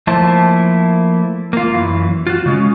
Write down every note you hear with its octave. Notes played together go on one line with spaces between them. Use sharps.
F3 A3 A#3 E4 C5 A5
A#3 F4
F#2 E3
F4 F#4
C#3 G#3 C#4